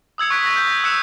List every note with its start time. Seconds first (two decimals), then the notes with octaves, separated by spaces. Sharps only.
0.18 D#6 E6 G#6 C#7
0.30 C#6 F#6 B6 D7
0.43 A#6 B6
0.56 G6
0.84 E6 F#6 C#7 E7 F7